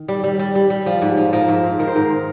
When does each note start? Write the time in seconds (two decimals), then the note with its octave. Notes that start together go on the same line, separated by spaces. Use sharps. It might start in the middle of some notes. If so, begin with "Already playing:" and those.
Already playing: D#3
0.08 G3
0.24 G3
0.39 G3
0.55 G3
0.70 G3
0.86 F3
1.02 G#2
1.17 F3
1.33 F3 A#4
1.48 G#2
1.64 G#2
1.79 D#3 A#4
1.88 C5
1.95 G#2 A#4